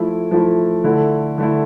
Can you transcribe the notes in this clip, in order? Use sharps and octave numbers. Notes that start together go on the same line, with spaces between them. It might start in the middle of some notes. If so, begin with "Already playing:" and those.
Already playing: F3 A3 E4
F3 A3 E4
D3 A3 E4
D3 A3 E4